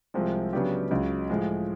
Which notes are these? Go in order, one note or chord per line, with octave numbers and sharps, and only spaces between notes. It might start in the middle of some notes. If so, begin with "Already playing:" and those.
C2 C3 F3 G#3
C#3 F#3 B3 D4 G4
C#2 C#3 F#3
A2 F3 G#3